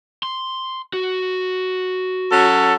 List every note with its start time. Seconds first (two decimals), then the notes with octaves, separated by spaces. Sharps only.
0.23 C6
0.93 F#4
2.31 F#3 C#4 A4